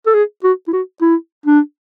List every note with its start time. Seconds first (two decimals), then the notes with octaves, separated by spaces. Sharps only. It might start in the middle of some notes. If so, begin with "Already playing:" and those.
0.07 A4
0.14 G#4
0.44 F#4
0.68 E4
0.73 F#4
1.02 E4
1.46 D4